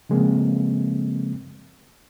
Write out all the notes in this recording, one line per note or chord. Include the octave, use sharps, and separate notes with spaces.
C#3 F3 G#3 A#3 C4